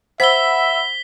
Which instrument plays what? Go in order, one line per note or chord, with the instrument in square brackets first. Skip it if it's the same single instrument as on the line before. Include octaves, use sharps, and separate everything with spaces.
[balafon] C5 [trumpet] E5 [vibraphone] F#5 B5 E6 [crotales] B6 G7